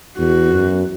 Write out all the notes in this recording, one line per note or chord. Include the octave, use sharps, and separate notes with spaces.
E2 F#4
F#2